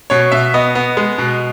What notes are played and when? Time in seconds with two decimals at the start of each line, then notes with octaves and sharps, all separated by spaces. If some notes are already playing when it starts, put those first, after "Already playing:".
0.10 B2 C#5
0.32 B2 E5
0.54 B3 D#5
0.75 B3
0.97 G#3
1.18 B2